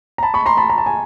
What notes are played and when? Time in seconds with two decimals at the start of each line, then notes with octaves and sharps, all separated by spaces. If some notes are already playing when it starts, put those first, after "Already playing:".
0.18 A#5
0.23 A5 B5
0.34 B5 C#6
0.46 A#5 C6
0.57 A5 B5
0.70 A#5
0.78 A5
0.86 G#5